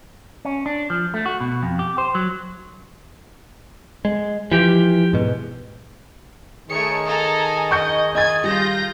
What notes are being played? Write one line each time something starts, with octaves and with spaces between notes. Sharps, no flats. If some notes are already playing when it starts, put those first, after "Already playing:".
C#4
D4
F3
A3
F#4
B2
F2
G4
C5
F#3
G#3
E3 F3 G4
G#2 B2
D#3 A3 G#4 C#5 C#7
A4 G#5 A#5
D#5 C#6 G6 C#7
D#5 G#5 G#6 A6
G3 F4 G6 A#6